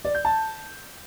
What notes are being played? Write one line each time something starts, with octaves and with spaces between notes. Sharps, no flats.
D5
G6
A5